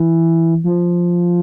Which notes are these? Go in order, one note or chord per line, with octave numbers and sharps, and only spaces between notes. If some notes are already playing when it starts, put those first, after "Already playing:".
Already playing: E3
F3